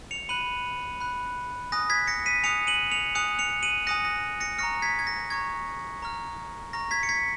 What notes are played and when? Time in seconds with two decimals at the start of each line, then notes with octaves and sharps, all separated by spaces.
0.11 C#7 F7
0.29 B5 F#6 D#7 F#7
1.00 B5 F#6
1.72 G#5 D#6 F#6 A#6
1.90 G#6 B6
2.07 A#6 C#7
2.26 B6 D#7
2.43 G#5 D#6 F#6 C#7 F7
2.67 D#7 F#7
2.92 C#7 F7
3.15 G#5 D#6 F#6 C#7 F7
3.39 C#7 F7
3.62 D#7 F#7
3.87 G#5 D#6 F#6 A#6 C#7
4.05 A#6
4.40 A#6 C#7
4.58 A#5 C#6 F6 A#6 C#7
4.82 G#6 B6
4.99 G#6
5.07 A#6
5.30 A#5 C#6 F6 G#6
6.02 A#5 C#6 F6
6.73 A#5 C#6 F6 A#6
6.91 G#6 B6
7.03 C#7
7.09 G#6 B6